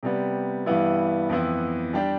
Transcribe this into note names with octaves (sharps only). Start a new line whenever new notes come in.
C3 G3 B3
G2 E3 G3 B3 E4
F2 E3 B3 E4
G3 D4 G4